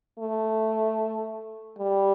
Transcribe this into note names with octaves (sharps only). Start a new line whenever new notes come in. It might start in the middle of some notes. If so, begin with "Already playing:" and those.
A3
G3